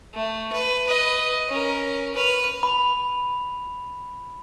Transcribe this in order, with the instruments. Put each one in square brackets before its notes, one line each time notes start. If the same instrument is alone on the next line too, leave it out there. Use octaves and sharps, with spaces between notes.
[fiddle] A3
B4
B4 D#5
C#4 A#4
B4 F6
[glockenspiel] B5 F7